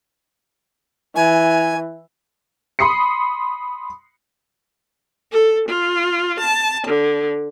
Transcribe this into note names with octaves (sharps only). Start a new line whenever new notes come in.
E3 G#5
B5 C6 D#6 C7 C#7
A4
F4
A5
D3